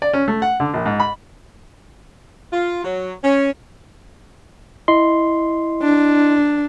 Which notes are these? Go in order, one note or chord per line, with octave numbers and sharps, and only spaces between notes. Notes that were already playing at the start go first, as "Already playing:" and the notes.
D5
C#4
A3
F#5
D3
A#1
G#2
B5
F4
F#3
C#4
E4 D#5 C6
D4